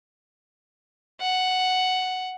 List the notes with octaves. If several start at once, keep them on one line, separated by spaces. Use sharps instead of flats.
F#5